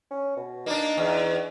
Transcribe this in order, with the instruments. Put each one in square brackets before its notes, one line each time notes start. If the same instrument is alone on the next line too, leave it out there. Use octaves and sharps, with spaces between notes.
[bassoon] C#4
B2
[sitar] A#3 D4 [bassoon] D#4
[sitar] E2